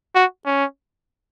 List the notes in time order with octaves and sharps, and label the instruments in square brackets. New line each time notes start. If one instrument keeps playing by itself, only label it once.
[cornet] F#4
C#4